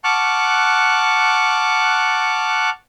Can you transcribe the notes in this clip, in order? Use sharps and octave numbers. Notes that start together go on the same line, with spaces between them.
F#5 A5 C#6 D6 F6 F#6